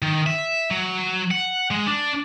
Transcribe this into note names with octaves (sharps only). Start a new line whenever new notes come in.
D#3
E5
F#3
F#5
G#3
D4